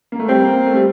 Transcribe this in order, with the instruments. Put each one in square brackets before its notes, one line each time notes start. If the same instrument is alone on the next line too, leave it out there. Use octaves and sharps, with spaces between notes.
[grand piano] A#3
A3
[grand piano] G3 [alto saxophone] C4
[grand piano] A#3
A#3
A3
G3